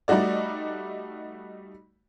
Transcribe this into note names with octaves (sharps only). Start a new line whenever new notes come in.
G3 A3 D#4 F#4 D5